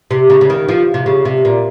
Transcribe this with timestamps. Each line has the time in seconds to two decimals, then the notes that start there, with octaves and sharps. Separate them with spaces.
0.11 C3
0.30 C#3
0.41 C#3
0.50 D#3
0.69 F3
0.94 C3
1.06 C#3
1.25 C3
1.45 A#2